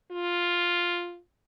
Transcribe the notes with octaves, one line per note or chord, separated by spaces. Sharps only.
F4